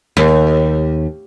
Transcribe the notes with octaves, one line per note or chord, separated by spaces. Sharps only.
D#2